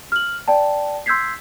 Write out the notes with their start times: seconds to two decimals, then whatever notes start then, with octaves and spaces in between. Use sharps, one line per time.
0.12 F6 F#7
0.48 D5 G5 A5
1.06 C6 E6 G6 G#6 B6 C7